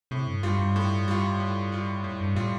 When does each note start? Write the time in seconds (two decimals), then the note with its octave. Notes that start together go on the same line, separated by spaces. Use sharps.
0.11 A2 C3
0.27 G2
0.43 G2 G3 F4
0.59 G2
0.76 A2
1.08 G3 F4
1.40 A2
1.72 G3 F4
2.04 F2 A2
2.21 G2
2.36 A2 G3 F4